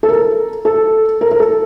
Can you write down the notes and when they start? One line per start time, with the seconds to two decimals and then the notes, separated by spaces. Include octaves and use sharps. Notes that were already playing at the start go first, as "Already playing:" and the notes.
0.03 A4
0.09 A#4
0.65 A4
1.21 A#4
1.31 A#4
1.40 A4